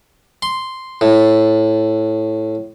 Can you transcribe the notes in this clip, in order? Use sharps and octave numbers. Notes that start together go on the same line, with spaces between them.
C6
A2